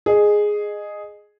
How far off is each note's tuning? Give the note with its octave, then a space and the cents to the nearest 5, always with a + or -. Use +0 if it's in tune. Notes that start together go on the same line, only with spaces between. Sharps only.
G#4 +0 D#5 -20